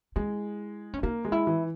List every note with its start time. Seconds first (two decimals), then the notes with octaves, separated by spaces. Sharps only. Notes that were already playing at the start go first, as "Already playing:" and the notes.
0.16 G#3 E4
0.94 C#4
1.03 A#3 D#4
1.25 G#3
1.32 E4
1.47 E3